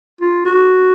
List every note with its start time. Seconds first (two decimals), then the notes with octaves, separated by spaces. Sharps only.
0.21 F4
0.46 F#4